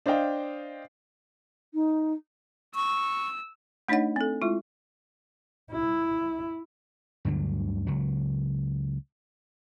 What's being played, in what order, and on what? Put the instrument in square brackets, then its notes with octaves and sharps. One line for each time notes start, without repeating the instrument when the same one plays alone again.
[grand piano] D4 C5 D#5 F5 G5
[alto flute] D#4
[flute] C#6 [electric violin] E6
[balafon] A3 D4 D#4 C#5 D#5 F#5
C4 A4
G#3 E4 F4
[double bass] E4
[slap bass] D2 G2 D3 F#3
C#2 F#3